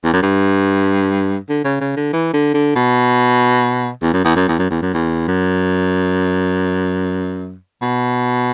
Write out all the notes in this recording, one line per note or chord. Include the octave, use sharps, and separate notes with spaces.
E2
F#2
G2
D3
C#3
C#3
D3
E3
D3
D3
B2
E2
F#2
E2
F#2
E2
F#2
E2
F#2
E2
F#2
B2